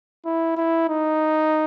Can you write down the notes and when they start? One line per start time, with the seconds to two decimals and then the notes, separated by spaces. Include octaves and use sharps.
0.25 E4
0.56 E4
0.89 D#4